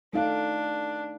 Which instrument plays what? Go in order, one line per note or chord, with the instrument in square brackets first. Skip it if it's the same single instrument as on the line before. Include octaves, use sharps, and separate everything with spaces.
[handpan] A3 D#4 F5 [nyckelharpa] D4